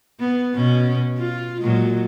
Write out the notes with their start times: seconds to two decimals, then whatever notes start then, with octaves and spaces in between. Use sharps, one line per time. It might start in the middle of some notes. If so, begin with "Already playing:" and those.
0.20 B3
0.55 B2 C#4
1.18 F4
1.62 A#2 F#3 G#3